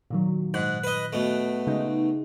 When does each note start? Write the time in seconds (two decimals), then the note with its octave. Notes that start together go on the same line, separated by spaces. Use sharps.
0.10 A#2 D#3 F#3
0.54 G#2 F#6
0.84 B4 D#5
1.13 B2 A3
1.67 C#3 G#3 D#4